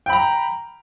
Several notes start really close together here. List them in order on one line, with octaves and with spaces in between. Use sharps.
G5 B5 A#5